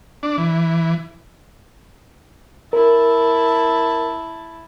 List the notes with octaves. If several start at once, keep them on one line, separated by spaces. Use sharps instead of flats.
D4
E3
E4 A#4 A5